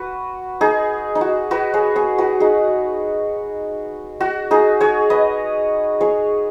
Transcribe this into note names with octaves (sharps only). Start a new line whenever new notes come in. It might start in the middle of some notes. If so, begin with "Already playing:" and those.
Already playing: F#4 B4
D#4 G#4
D#4
F#4
F#4 B4
G#4 C#5
G#4 C#5
F#4 B4
D#4 G#4
F#4
D#4 G#4
G#4 C#5
B4 D#5
G#4 C#5